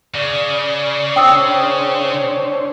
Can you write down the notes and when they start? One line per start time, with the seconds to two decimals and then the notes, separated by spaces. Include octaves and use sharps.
0.15 C#3 D5
1.16 D4 C5 C#5 G5 D#6 E6